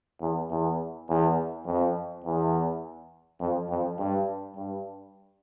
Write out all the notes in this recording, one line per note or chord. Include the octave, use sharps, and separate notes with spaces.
E2
E2
E2
F2
E2
F2
F2
G2
G2